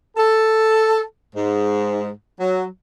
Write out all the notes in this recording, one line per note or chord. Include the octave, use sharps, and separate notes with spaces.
A4
G#2
F#3